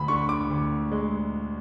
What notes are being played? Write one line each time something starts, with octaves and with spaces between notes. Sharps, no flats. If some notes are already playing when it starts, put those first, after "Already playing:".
Already playing: D2 B5
D3 C#6
D6
D2
G#3